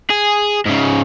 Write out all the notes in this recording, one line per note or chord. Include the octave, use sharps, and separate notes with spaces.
G#4
G#2 C#3